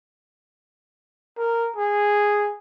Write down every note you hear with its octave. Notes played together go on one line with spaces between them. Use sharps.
A#4
G#4